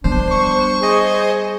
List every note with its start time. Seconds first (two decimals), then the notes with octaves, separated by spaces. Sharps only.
0.04 G3 B3 D4 C5
0.32 C#6
0.81 G#4 C5 D#5